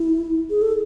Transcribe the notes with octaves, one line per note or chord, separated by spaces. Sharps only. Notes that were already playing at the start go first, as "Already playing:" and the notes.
Already playing: E4
G#4
A4